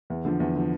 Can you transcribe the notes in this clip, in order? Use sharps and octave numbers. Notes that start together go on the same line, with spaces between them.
E2
D3 F3
E2
D3 F3